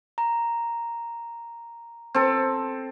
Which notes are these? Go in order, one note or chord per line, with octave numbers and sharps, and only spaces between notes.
A#5
C4 A4